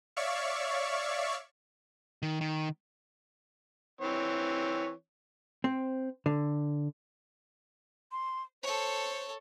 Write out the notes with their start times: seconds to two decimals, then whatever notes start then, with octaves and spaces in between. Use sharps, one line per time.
0.16 C#5 D5 E5 F5 C#6
2.22 D#3
2.41 D#3
4.01 E3 C4 C#5
5.64 C4
6.26 D3
8.12 C6
8.63 A4 C5 C#5